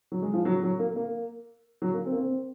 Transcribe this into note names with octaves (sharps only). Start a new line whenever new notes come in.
F#3
G#3
F3
F#3
F#3
A#3
A#3
F#3
A#3
C4
A#3
C4